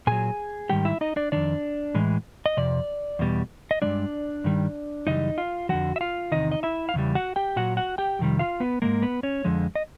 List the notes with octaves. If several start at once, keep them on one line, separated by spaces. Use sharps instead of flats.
A#2 F#3 G#4 G#5
G#2 D#3 G3 G4 G5
E4 E5
D#4 D#5
D4 D5
F2 C3 D#3 D4 D5
A2 E3 G#3
D#5
F2 C3 D5
E2 B2 G3
D#5
G2 E3 G#3 D4 D5
G2 D#3 G3
F#2 C#3 E3 G3 D#4 D#5
F4 F5
F2 D3 F3 F#4 F#5
E5
F4 F5
E2 C3 D#3 D#4 D#5
D#5
E4 E5
F5
E2 C#3 E3 G3
F#4 F#5
G4 G5
A#2 F#3 F#4 F#5
F#4 F#5
G4 G5
F2 C3 D#3 G3
F4 F5
B3 B4
G#2 D#3 G#3 A#3 A#4
B3 B4
C#4 C#5
F2 D3 F3 G#3
D#5